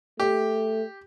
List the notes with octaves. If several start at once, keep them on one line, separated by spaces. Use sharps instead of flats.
A3 G4